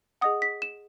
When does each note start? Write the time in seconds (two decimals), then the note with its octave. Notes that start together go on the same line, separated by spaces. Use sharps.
0.21 G#4 D#5 F#5 D#6
0.42 B6
0.62 E7